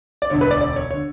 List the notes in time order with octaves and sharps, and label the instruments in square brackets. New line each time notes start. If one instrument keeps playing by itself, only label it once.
[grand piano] D5
E1 D2 D3 C#5
B4
D5
D5
C#5
D3 C#5